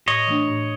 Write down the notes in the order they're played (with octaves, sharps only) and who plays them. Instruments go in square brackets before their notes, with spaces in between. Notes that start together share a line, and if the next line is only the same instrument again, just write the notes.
[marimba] A2 [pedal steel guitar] C#5 D#5
[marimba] E3 A3 D4
A2